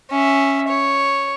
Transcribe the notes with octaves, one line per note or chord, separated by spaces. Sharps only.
C#4 E5
C#5